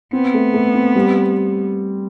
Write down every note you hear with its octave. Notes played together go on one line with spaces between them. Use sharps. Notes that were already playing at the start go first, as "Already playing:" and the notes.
B3 C4
A3
A3
C4
G3